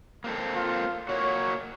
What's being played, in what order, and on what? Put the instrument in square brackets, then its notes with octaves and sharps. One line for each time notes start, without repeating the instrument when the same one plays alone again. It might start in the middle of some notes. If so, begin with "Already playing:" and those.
[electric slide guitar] A#3 C4 A4
[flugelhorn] F4
[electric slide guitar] A#3 F#4 [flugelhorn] C#5